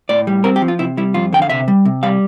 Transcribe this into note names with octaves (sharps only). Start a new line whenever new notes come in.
A2 D5
G3
C4 A#4
G4
F3
F4
C3 E4
G3 E4
F2 F4
D3 G5
F5
C3 E5
G3
C3
G3 F5